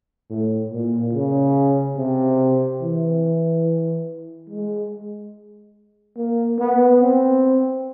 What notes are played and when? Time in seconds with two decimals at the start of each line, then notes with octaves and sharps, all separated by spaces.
0.30 A2
0.72 A#2
1.13 C#3
1.97 C3
2.82 E3
4.50 G#3
6.17 A#3
6.59 B3
7.01 C4